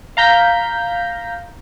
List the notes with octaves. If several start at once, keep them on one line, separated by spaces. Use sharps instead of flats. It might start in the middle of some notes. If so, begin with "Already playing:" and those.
F5 A#5 G6 B6